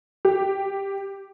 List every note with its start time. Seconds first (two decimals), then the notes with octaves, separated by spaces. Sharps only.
0.25 G4